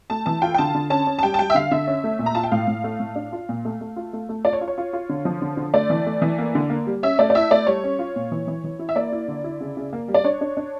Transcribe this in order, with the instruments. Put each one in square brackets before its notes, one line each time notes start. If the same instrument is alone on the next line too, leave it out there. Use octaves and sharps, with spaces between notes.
[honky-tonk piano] A3 A5
E3 A5
F4 G5
G5
D3 A5
D3
C#4 A5
C#4
A5
G3 G5
A5
G3 G5
E5
D3 F5
D3 E5
C#4
A3
A#2
A#5
F4 A5
G5
A2 F5
A2
A3
A2
D4
F4
A#2
A3
A3
F4
A3
A3
F4 D5
C#5
F4
C#5
F4
F4
D3
F3
D3
D3
A3 D5
E3
A3
E3
A#3
D3
A#3
G3
C#4 E5
A3 D5
D5
E4 E5
A3 D5
G3 C#5
C#4
F4
A#2
E3
E3
E3
E4
E5
A#3 D5
E4
D3
E4
C#3
C#3
A#3
G3
D5
D4 C#5
D4
D4